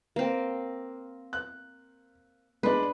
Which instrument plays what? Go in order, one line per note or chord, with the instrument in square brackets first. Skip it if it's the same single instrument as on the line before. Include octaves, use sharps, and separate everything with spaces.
[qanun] A#3 C4
[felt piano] F#6
[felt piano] G#3 D4 [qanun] B4